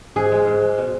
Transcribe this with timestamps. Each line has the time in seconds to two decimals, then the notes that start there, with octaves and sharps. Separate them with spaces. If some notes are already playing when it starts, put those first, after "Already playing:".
0.16 G#2 G#4
0.32 G#3
0.46 G#2
0.62 G#3
0.78 B2